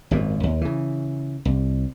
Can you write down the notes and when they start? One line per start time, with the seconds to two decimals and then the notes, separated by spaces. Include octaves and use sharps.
0.11 G#1 F#2 A#2
0.43 D#2
0.61 C#3 E3
1.45 C2